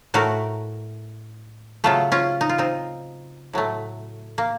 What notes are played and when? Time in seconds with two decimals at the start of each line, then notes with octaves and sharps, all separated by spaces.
0.14 A2 A3 F#4 A#4
1.84 C#3 F#3 A3 F4 A4
2.12 C#4 F4
2.41 D#4
2.49 F4
2.58 C4 D#4
3.53 A2 F#3 A3
4.38 A#3